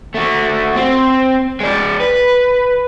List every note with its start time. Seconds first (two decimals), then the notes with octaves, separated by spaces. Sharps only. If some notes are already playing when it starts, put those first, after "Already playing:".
0.15 A3 F#4
0.76 C4
1.60 G#3 D5
2.00 B4